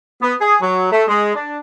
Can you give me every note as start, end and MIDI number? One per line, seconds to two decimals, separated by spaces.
0.22 0.33 59
0.40 0.55 68
0.62 0.88 54
0.92 1.02 57
1.08 1.32 56
1.35 1.58 62